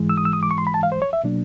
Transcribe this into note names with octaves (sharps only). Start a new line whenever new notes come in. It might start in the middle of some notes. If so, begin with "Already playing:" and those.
Already playing: G#2 E3 G#3
E6
D#6
E6
D#6
D6
C#6
C6
B5
A5
F5
C5
C#5
E5
B2 F#3 A#3 D4